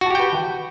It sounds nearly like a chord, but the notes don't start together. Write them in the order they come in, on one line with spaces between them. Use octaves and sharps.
F#4 A5 G4 G5 B4